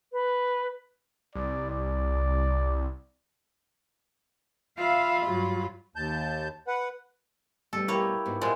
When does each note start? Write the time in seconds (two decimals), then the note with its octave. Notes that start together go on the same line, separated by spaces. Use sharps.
0.12 B4
1.35 C2 D5
1.70 D5
4.77 F4 E5 F5 B5
5.25 G2 F#3
5.96 D#2 A5 G6
6.67 B4 F#5
7.73 B2 G3 A3 A4
7.88 A#3 E4 G4 C#5
8.26 G#2 B3 F#4
8.41 A#2 F3 G#3 D5 E5 G#5 C6